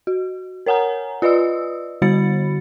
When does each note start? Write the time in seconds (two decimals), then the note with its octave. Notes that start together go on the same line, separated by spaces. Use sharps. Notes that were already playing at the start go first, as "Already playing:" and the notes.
0.07 F#4
0.66 A#4 C#5 F#5 G#5 A#5
1.22 F4 B4 D5 D#5 D#6 E6
2.02 D3 G3 F#4 B5 A6 C#7